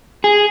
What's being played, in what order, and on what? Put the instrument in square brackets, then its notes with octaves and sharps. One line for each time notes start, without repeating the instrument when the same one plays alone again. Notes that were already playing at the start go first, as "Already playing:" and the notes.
[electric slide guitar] G#4